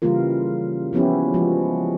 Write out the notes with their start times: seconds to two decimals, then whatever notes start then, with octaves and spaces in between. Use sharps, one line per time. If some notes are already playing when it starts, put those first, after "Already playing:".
0.02 C#3 E3 G3 A#3 F4 A#4
0.93 F3 B3 C#4 E4 G4
1.34 F3 G#3 F#4